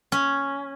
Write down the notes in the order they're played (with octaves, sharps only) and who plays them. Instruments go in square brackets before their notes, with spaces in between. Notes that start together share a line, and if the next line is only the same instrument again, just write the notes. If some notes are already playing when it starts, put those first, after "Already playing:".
[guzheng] C#4